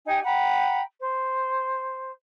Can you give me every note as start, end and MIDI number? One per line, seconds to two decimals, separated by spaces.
0.06 0.19 63
0.06 0.19 67
0.06 0.19 79
0.06 0.19 80
0.23 0.80 78
0.23 0.80 79
0.23 0.80 82
0.23 0.80 83
1.01 2.12 72